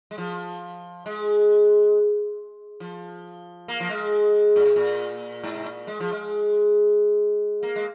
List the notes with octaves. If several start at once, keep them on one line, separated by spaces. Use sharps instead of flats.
G#3
F3
G#3
F3
A#3
F3
G#3
A#2
C3
A#2
G#2
C3
A#2
G#3
F3
G#3
A#3
G#3